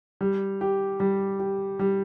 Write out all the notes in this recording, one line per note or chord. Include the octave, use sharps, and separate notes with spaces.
G3
G4
G3
G4
G3